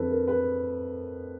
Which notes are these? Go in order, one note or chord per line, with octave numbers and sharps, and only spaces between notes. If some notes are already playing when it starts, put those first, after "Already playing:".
Already playing: F2 D3 F3 A4 B4
A#4
B4